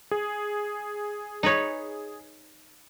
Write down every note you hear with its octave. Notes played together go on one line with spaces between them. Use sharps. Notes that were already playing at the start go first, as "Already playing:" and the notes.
G#4
D#4 B4 C#5